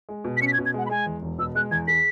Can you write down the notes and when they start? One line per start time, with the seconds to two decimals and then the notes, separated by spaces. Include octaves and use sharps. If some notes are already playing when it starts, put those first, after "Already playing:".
0.09 G#3
0.24 B2
0.37 B6
0.42 C#4 C#7
0.47 B6
0.53 G#6
0.58 B2
0.66 G#6
0.74 G#3 F#5
0.86 B5
0.90 G#3 G#5
1.06 E2
1.22 E1
1.39 B2 E6
1.55 G#3 F#6
1.71 E2 G#6
1.88 G#4 B6